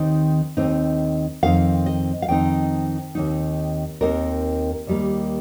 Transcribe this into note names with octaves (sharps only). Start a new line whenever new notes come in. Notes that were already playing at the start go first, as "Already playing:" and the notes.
Already playing: D#2 D#3 C4 D#4
D#2 D#3 C4 D#4
F2 D#3 C4 D#4 F5
D#5
F5
F2 D#3 C4 D#4 G5
D#2 D#3 C4 D#4
D#2 D#3 C4 D#4 A#4
D#2 D#3 G3 A#3